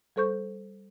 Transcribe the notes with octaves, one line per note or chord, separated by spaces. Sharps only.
G3 A4 C5 C#6 G6